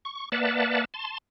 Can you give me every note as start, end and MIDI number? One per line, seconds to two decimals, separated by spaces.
0.05 0.29 85
0.32 0.85 58
0.32 0.85 71
0.32 0.85 74
0.32 0.85 76
0.32 0.85 78
0.32 0.85 81
0.94 1.18 81
0.94 1.18 84